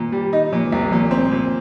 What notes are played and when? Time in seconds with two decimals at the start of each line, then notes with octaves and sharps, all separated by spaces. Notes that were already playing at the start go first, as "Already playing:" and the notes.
Already playing: A#2 D#3
0.12 G3
0.33 D#4
0.52 A#2 F3
0.66 D#3
0.72 C2
0.78 G3
0.91 A#2 F3
1.11 C4
1.31 A#2